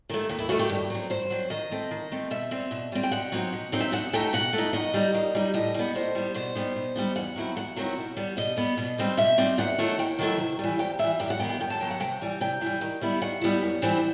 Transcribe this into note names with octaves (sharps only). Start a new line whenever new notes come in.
D#3 A3
D#2
E4
D#3 A3 F#4
G4
G2
F#3 C4
G2 C5
F#3 C4
D#3 D#5
A3 C4
D#3
A3 C4
B2 E5
G3 C4
B2
G3 C4
G5
B2 F#5
F#3 C4 D#4
B2
F#3 C4 D#4
E5
B2 F#5
A3 D#4 G5
B2 F#5
A3
D#4
D#3 D#5
G3 D#4
D#3
G3 D#4
A2 D#5
G3 B3
A2 C5
G3 B3
B2 C5
G3 B3 D#4
B2
G3 B3 D#4
E2 F#5
D#3 F#3 C4 E4
E2 F#5
D#3 F#3 C4 E4
B2
G3 B3
B2 D#5
G3 B3
B2
G3 C4 D#4
B2 E5
G3 C4 D#4
D#2 F#5
D#3 F#3 A3 E4
D#2 G5
D#3 F#3 A3 E4
C3
E3 G3
C3 G5
E3 G3 E5
F#2 G4
F#5
D#3 F#3 B3 G5
G5
F#2 G5
A5
D#3 F#3 B3 G5
F#5
C3 G5
E3 G3
C3 G5
E3 G3
D#3
G3 B3 E4
D#3 F#5
G3 B3 E4
F#2
E3 G3 C4 E4